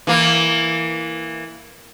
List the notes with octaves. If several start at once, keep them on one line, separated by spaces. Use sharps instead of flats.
E3 A#3